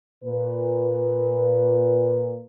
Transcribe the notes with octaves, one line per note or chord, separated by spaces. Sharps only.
A#2 B4